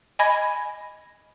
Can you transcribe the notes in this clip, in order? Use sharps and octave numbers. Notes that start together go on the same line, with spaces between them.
D#5 G#5 B5 G#6 A#6